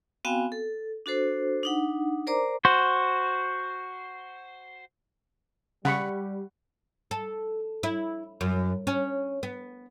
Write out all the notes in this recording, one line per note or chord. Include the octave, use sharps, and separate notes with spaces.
B3 C4 F#4 F5 G5 G#5
A4
D4 F#4 A4 C5
D4 D#4 F#5
A#4 C5 D5 A#5 D6
F#4 C5
C#3 G3 F#5 B5 C#6
A4
E4
F#2
C#4
B3